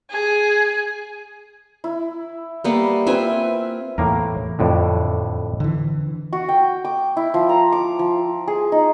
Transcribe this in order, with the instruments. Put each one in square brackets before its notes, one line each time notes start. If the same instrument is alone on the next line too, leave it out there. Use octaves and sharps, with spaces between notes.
[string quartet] G#4
[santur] E4
[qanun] G3 A#3 B3
[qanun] C4 F4 G#5 [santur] B4 E5
[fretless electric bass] E2 [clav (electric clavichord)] A2 A#3 A#4
[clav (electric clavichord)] F2 A2 D3
[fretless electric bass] D3 E3
[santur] F#4
G5
D6
E4
F3
A#5
D6
F3
G#4
D#4